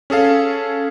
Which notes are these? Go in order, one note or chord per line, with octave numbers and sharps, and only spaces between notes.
C#4 G#4 A4 F5